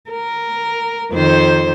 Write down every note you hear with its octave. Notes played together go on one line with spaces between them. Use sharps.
A#4
F2 D#3 C5